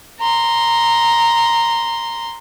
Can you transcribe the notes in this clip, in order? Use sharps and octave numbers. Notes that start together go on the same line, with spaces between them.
A#5 C6